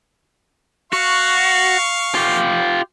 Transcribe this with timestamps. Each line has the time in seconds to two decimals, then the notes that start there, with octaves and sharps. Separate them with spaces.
0.93 F#4 F5 C#6
2.15 F4 G4